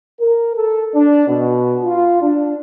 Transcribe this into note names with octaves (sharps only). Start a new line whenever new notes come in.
A#4
A4
D4
B2
F4
D4